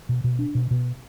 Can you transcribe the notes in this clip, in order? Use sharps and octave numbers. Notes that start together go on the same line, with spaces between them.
B2
B2
D4
B2
B2